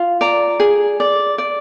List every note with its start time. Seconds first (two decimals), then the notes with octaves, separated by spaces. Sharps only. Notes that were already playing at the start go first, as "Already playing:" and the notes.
Already playing: F4
0.21 D5 A#5
0.60 G#4
1.00 D5
1.38 D5